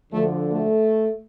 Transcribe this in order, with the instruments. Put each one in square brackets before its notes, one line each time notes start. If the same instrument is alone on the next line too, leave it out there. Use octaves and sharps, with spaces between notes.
[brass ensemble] D2 D3 F3 A3
A3